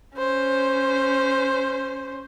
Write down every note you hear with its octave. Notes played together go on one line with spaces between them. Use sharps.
C#4 C5